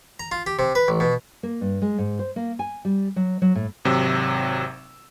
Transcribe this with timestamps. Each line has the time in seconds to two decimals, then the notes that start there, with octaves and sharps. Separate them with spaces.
0.20 A#5
0.32 F4
0.47 G4
0.59 C3
0.75 B4
0.88 A1
1.00 B2
1.43 A#3
1.61 G2
1.82 G#3
1.98 G#2
2.19 C5
2.36 A#3
2.59 G#5
2.85 G3
3.16 F#3
3.42 F#3
3.55 A2
3.85 G#1 C3 F#3 E6